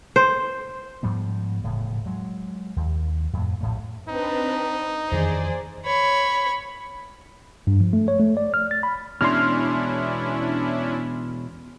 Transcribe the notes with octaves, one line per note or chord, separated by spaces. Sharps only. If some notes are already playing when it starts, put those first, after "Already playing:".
C5
G#2 F3 G3 B3
E1 A2 C#3
F#3 G#3
D#2
F2 A2
A#1 A2 A3
C4 D4 D#4 B4
F2 D#3 E3 G#4 C5 D5
C#5 B5
G2
F3
A3
C#5
A3
D5
F6
A6
B5
E2 B2 G#3 C#4 D4 E4 C6 F6